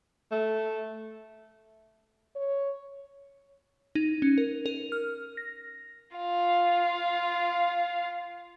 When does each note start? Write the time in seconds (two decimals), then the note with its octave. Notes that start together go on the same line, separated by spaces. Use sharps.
0.32 A3
2.36 C#5
3.95 D#4
4.22 C#4
4.38 A#4
4.66 A#4
4.92 F6
5.37 A#6
6.16 F4 F5